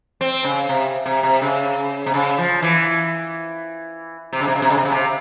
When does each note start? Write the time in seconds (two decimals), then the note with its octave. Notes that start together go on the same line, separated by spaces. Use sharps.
0.21 C4
0.44 C#3
0.69 C3
1.06 C3
1.23 C3
1.41 C#3
2.06 C3
2.14 C#3
2.38 F3
2.62 E3
4.33 C3
4.41 C#3
4.47 C3
4.55 C#3
4.62 C3
4.70 C#3
4.77 C3
4.85 C#3
4.92 C3